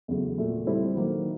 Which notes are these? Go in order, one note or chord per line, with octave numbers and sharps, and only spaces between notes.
E2 C#3 F#3 A3
A#2 F#3 A3
G3 C4 E4 A4 C5
D#3 F#3 A#3